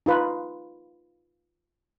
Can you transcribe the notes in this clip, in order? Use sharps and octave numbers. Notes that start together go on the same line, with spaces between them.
D#4 F4 B4